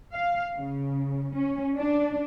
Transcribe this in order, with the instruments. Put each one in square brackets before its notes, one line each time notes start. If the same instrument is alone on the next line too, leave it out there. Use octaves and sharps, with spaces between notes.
[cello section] F5
C#3
C#4
D4